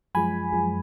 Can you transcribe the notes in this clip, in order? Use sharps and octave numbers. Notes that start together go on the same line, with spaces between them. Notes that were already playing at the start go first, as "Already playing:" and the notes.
F#2 F3 G#3 G#5 B5
F#2 F3 G#3